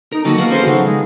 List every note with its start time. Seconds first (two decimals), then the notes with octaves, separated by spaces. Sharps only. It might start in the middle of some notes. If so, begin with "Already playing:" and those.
0.12 D#4 A#4
0.25 D3 D#3 F#3 A#3 F#4 D#5 A5
0.38 A#3 B3 A#4 F#5
0.50 C#4 F#4 G#4 A4 C5 F5
0.66 C#3 F3 F#3 D#4
0.85 G#3